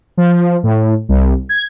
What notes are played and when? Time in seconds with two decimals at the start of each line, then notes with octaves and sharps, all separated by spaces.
0.17 F3
0.63 A2
1.09 C2
1.49 G#6